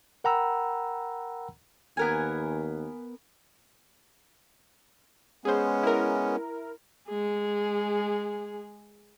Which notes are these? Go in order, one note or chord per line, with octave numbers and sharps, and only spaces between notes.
A#4 F#5 G5 A#5 B5 E6
D#2 B3 A#4 G#5
G#3 B3 C#4 G#4 C5
E4 A#4
G#3 G#4